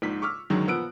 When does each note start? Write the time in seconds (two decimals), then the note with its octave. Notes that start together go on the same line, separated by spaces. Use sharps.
0.02 A#1 G#2 B6
0.22 C#6 D6 E6 F6
0.50 F#2 D3 D#3 F#3 G#3
0.67 A#2 F3 B3 E6 F#6 D7